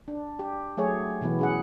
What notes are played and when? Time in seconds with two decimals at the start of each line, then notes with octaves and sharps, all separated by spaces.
0.08 D4
0.39 G4
0.77 F#3 A3 G#4 C#5
1.21 B2 E3 B3 E4
1.39 C#4 G#4 F#5